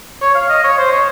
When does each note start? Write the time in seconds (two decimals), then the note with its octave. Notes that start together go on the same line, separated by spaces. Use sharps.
0.22 C#5
0.35 F5
0.50 D#5
0.64 C#5
0.78 C5
0.92 C#5